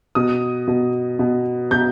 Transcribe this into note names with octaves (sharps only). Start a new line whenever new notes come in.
B2 D#6
B2
B2
B2 G6